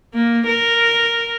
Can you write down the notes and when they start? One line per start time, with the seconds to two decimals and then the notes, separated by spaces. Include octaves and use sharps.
0.14 A#3
0.46 A#4